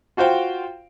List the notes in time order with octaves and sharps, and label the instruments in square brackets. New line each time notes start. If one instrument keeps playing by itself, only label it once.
[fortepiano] F4 F#4 C5 F5 G5